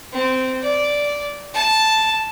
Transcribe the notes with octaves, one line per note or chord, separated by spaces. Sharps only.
C4
D5
A5